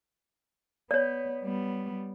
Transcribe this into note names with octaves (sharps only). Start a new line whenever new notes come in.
B3 C#5 D5
G3 B3